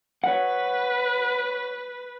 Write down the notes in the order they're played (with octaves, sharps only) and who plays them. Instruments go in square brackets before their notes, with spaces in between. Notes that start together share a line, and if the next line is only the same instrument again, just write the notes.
[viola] B4 [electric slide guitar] C#5 F#5